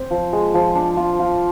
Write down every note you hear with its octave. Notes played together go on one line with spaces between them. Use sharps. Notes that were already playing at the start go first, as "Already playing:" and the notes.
Already playing: C4
F3
G#3
F3
D4
F4
F4